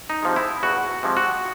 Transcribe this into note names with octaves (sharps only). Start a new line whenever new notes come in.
D#4
C3 F3 G#3
E4
E2 F#4
C3 F3 G#3
F#4